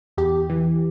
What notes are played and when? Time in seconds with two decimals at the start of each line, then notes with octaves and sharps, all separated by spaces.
0.17 E2 G4
0.50 E3